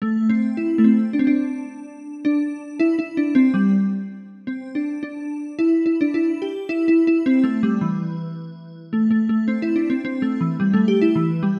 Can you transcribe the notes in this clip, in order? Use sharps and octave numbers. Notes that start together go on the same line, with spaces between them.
A3
C4
E4
A3
C4
D4
C4
D4
D4
E4
E4
D4
C4
G3
C4
D4
D4
E4
E4
D4
E4
G4
E4
E4
E4
C4
A3
G3
E3
A3
A3
A3
C4
E4
D4
C4
C4
A3
E3
G3
A3
G4
E4
E3
G3